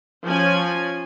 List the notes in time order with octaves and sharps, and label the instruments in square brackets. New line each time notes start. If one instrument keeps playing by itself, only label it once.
[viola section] F3 C#4 G#5